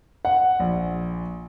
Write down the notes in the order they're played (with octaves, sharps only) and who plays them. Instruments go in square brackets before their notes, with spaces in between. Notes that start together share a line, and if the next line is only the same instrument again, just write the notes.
[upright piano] F#5
A#1